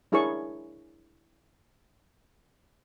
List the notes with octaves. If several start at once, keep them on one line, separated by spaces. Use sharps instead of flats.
D4 E4 G#4 A#4 C#5 C#6